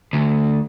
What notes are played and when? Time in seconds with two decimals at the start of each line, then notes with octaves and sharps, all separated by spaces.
0.13 D2